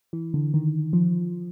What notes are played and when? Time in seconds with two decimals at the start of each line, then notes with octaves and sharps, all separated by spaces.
0.13 E3
0.34 D3
0.54 D#3
0.93 F3